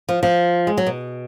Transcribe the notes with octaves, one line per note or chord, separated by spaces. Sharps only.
F3
F3
G#3
F#3
B2